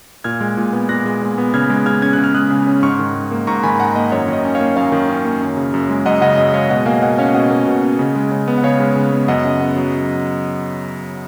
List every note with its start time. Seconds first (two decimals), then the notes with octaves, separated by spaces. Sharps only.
0.24 A#2 F6 G#6
0.41 G#3
0.57 A#2
0.73 B3
0.89 A#2 F#6 A#6
1.06 G#3
1.21 A#2
1.38 B3
1.54 C#3 F6 G#6
1.70 G#3
1.86 C#3 F6 G#6
2.02 C#4 G#6
2.13 C#3 F#6
2.24 F6
2.34 G#3 D#6 F#6
2.50 C#3
2.67 C#4
2.83 G#2 C#6 F6
2.99 D#3
3.15 G#2
3.31 A#3
3.47 G#2 A#5 C#6
3.63 D#3 G#5 B5
3.80 G#2 F#5 A#5
3.96 A#3 D#5
4.12 F#2 C#5
4.28 D#3
4.33 D#5
4.44 C#4
4.55 C#5 F5
4.60 A#3
4.77 F#2 C#5 F5
4.92 D#3
5.09 C#4
5.25 A#3
5.41 F#2
5.57 C#3
5.74 F#2
5.89 G#3
6.06 F#2 D#5 F#5
6.21 C#3 D#5 F#5
6.37 F#2 D#5
6.54 G#3 C#5 F5
6.70 B2 D#5 F#5
6.86 A#3 F5 G#5
7.02 B2 D#5 F#5
7.18 C#4 C#5 F5
7.34 B2 D#5 F#5
7.51 A#3
7.67 B2
7.83 C#4
7.99 C#3
8.15 G#3
8.32 C#3
8.48 B3
8.58 F#5
8.63 C#3 C#5 F5
8.80 G#3
8.96 C#3
9.13 B3
9.28 F#2 D#5 F#5
9.45 C#3
9.61 B3
9.76 F#3